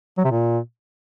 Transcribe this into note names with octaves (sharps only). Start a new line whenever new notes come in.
F#3
C3
A#2